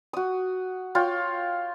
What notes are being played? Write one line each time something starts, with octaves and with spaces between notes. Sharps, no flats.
F#4 D#6
F4 C#5 G5